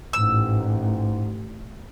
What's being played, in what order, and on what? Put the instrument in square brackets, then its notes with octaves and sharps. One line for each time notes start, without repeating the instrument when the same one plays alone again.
[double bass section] A1 [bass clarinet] G#2 [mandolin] E6